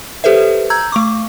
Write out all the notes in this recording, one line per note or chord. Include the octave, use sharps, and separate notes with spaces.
G4 A4 B4 C5 E5
A#5 E6 G6 G#6
A3 C#6 D6